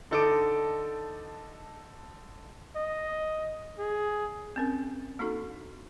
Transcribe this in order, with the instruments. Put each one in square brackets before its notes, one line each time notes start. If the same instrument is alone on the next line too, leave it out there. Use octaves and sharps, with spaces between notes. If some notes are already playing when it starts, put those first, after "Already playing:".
[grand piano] D3 D#4 A4 D#5 D6 D7
[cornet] D#5
G#4
[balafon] C4 C#4 A#4
A#3 D4 D#4 F#4 A4